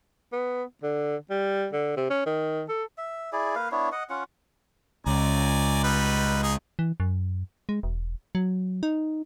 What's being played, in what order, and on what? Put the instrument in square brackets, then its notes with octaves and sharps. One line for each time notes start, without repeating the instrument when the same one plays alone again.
[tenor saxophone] B3
D3
G3
D3
C3
C#4
D#3
A4
[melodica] E5
E4 G#4 D5
A#3 B4 F5
B3 D4 E4 C#5
D#5 F#5
C#4 F4 F#5
[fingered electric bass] C#2 [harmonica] D5 G#5 A#5
[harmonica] G3 D#4 B4
D#4 G#4
[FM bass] E3
F#2
G#3
E1
F#3
D#4